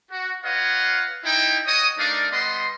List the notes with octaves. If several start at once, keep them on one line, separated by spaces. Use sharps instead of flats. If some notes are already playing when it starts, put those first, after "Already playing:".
F#4
F4 B4 C#5 D#5 F5 F#5
D#4 E4 G5
F#4 C#5 D#5 D#6
A3 D4 D#4 A#4 D5 F5
G3 B3 D#5 C6